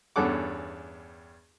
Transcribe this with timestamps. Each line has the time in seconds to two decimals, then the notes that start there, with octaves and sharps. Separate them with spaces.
0.16 E2 G2 C#4 A4 F#5 D6